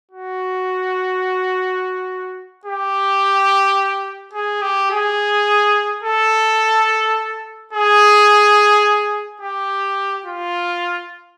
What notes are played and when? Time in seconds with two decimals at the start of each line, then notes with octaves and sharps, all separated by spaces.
0.12 F#4
2.65 G4
4.33 G#4
4.62 G4
4.91 G#4
6.03 A4
7.73 G#4
9.42 G4
10.26 F4